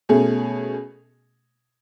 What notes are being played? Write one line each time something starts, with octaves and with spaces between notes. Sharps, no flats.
B2 A3 C#4 G#4